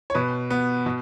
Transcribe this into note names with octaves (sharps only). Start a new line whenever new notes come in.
C#5
B2 B4
B3
B2